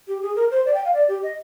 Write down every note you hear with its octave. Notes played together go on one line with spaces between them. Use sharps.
G4
G#4
A#4
C5
D5
G5
F5
D5
G4
D#5